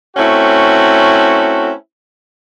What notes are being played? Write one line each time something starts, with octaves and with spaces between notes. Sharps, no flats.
A3 C4 C#4 E4 F#4